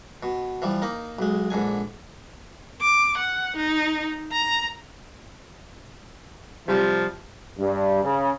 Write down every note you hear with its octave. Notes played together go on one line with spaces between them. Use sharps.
B2
E3 F3 G3
A#3 D#4
B1 G#3
A#1 G#2 D3 G#5
D6
F#5
D#4
A#5
C3 F3 G3
G2
C#3